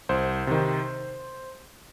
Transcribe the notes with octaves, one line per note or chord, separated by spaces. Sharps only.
C2 C5
C3 D#3